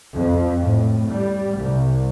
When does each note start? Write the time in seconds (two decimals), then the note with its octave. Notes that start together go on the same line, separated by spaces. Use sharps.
0.15 F2
0.61 A2
1.09 G3
1.56 C2